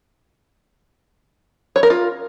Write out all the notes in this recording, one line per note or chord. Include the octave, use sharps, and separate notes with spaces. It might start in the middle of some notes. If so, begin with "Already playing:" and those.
C#5
A#4
F4